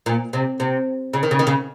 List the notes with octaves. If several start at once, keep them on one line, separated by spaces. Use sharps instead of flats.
A#2
C3
C3
C#3
D#3
C#3
D#3
C#3